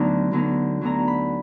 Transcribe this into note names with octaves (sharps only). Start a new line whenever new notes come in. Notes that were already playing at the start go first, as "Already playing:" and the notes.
Already playing: D2 D3 F#3 B3 D#4
D2 D3 F#3 B3 D#4
D2 D3 F#3 B3 D#4 A#5
B5